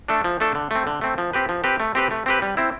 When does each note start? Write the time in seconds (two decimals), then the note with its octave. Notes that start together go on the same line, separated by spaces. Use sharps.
0.08 A3 D4 A4
0.24 F3
0.40 A3 D4 A4
0.55 D3
0.71 A3 C4
0.87 D3
1.01 A3 C4
1.18 F3
1.33 C4 G4 B4
1.49 F3
1.64 C4 G4 B4
1.80 A3
1.95 C4 G4 B4
2.11 A3
2.26 C4 G4 B4
2.42 G3
2.57 C4 E4